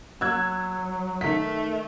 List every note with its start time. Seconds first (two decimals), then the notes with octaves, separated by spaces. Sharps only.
0.21 F#3 E6 F#6 G#6
1.21 D#3 A3 B6